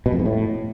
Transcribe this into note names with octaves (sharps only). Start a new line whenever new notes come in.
B2
F2
G#2
A2